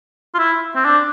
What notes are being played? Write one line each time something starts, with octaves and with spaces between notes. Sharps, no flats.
F4
E4
C4
D4